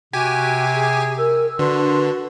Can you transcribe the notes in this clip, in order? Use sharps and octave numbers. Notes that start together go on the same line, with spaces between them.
C3 F#4 G4 G#5
G#4
A#4 E6
D3 F#4 B4 C6